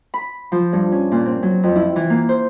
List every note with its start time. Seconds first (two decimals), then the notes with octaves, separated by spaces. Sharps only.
0.14 B5
0.52 F3
0.73 G2
0.92 C#4
1.12 A#2
1.26 C4
1.43 F#3
1.63 F2
1.75 E4
1.96 E3
2.10 A#3
2.29 C5